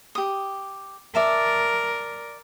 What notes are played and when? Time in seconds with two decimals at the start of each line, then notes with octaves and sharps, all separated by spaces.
0.15 G4 D#6
1.15 A#4 D5 E5 A5